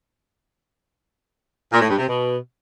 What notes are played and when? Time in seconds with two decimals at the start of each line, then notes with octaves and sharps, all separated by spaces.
1.72 A#2
1.81 A2
1.90 G2
1.98 C3
2.07 B2